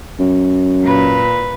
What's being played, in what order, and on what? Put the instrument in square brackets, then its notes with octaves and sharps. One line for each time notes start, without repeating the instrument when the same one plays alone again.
[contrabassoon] F#2
[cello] A#2 B4